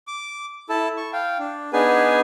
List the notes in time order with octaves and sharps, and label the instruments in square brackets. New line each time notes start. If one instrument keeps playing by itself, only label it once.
[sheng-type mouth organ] D6
E4 A4 A5
C#6
F5 G5
D4
B3 D4 D#4 G#4 B4 G#5